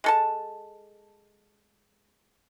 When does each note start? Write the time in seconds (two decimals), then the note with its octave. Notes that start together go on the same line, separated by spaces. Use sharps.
0.04 G#3 A4 A5